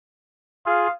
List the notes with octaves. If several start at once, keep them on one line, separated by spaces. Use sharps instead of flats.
F4 G#4 F5